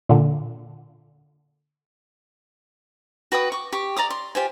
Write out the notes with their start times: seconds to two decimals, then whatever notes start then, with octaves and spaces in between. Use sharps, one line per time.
0.09 A#2 D3
3.32 F#4 B4 G5 D#6
3.52 C#6 D6
3.72 G4 C#6
3.96 D5 A#5 D6 D#6
4.10 C6
4.35 F4 G4 C5 G#5